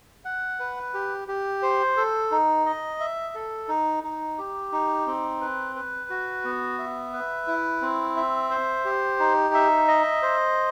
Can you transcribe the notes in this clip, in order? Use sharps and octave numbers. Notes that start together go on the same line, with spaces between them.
F#5
B4
G4
G4
C5
A4
D#4
D#5
E5
A4
D#4
D#4
G4
D#4
C4
B4
B4
F#4
B3
E5
B4
E4
C4
E5
C5
G4
D#4
E5
D#5
C5